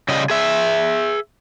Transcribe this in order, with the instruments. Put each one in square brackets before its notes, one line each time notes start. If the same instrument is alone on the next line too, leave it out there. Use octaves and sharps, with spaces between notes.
[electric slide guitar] C#3 G3 D#5
G#4 E5